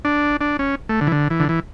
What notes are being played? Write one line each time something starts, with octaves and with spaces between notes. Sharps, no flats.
D4
D4
C#4
A3
D3
E3
D3
E3
D3
E3